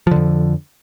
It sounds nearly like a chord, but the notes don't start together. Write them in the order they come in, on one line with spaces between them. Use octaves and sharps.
F3 D3 F2